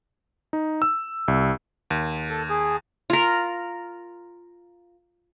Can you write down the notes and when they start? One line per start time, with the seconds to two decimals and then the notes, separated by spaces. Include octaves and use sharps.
0.53 D#4
0.82 E6
1.28 C2
1.91 D#2
2.30 A4
2.49 G#4
3.10 F4 A#4